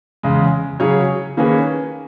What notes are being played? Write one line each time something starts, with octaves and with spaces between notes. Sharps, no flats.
E2 C#3 G#3
C#3 F#3 C#4 G#4 C#5
D#3 A#3 C#4 G#4 B4